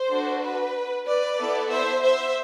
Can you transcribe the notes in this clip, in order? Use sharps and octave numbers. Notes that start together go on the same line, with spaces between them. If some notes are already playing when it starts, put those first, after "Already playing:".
Already playing: C5
D4 F#4 A4
B4
B4 D5
B3 E4 A4
C5 E5
C5 E5